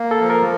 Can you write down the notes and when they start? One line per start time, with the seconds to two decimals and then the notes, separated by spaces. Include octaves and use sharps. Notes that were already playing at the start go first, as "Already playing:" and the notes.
Already playing: A#3
0.11 A4
0.21 F3
0.30 A#4